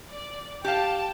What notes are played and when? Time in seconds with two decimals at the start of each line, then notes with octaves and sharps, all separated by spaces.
0.10 D5
0.64 G4 F5 G5 A5